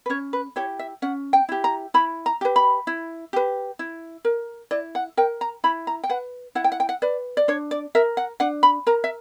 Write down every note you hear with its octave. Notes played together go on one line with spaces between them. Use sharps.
B4
C#4 C#5
B4
E4 G4 C#5
E5
C#4 F#5
G5
E4 G4
A#5
E4 B5
A#5
G4 B4
B5
E4
G4 B4
E4
A#4
E4 D5
F#5
A#4 G5
A#5
E4 B5
A#5
G5
B4 F#5
E4 F#5
G5
F#5
G5
F#5
B4 D5
D5
D4 C#5
D5
A#4 E5
F#5
D4 F#5
B5
A#4 A#5
E5